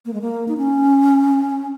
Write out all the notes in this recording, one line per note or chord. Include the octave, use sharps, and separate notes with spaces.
A#3
G#3
A#3
D#4
C#4